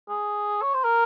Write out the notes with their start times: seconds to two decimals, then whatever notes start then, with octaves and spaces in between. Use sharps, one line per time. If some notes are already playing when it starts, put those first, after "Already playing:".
0.09 G#4
0.62 C#5
0.74 C5
0.84 A#4